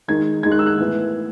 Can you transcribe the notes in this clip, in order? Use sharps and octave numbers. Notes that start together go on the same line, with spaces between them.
D#3 G#3 D#4 G#6
D#3 G#3 D#4 G#6
F#6
E6
F#6
A2 E3 B3